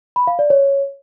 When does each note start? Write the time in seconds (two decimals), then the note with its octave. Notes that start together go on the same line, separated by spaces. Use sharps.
0.16 B5
0.27 F5
0.39 D5
0.50 C#5